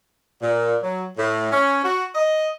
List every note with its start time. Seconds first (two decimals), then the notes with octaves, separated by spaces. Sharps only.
0.42 A#2
0.82 F#3
1.18 A2
1.52 C#4
1.84 F#4
2.15 D#5